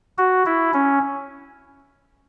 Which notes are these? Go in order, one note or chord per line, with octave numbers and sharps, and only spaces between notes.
F#4
E4
C#4